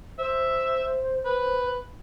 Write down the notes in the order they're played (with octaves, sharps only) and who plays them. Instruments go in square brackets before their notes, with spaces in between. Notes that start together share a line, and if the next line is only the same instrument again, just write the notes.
[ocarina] C5 [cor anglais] E5
[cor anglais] B4